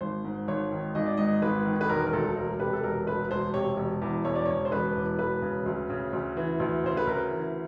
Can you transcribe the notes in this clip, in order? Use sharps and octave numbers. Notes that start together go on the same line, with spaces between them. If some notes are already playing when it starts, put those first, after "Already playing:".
G#1 C5
G#2
G#1 C#5
D#3
G#1 D#5
D5
G#2 D#5
G#1 B4
D#3
B4
E1 A#4
A#4
D2 A4
E1 A#4
C3 B4
A4
E1 A#4
D2 B4
E1 C5
C3 C#5
E1
E2
E1 C#5
D5
C#3 C#5
C5
E1 B4
E2
E1 B4
C#3
D2
C#3
D2
E3
D2
C#3 C5
B4
D2 A#4
E3